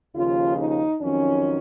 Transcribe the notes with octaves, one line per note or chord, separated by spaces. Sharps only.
D#2 C#3 F3 F4
D#4
F2 D#3 F#3 C#4